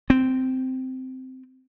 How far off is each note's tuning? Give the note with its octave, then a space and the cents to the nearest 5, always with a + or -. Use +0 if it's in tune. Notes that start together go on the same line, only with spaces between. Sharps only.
C4 -10